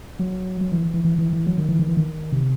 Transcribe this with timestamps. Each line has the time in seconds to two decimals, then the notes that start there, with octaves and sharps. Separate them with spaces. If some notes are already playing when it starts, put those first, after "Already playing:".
0.19 F#3
0.61 F#3
0.72 E3
0.94 E3
1.05 E3
1.18 E3
1.33 E3
1.47 F#3
1.58 D#3
1.69 E3
1.79 D#3
1.88 E3
1.97 D#3
2.32 C3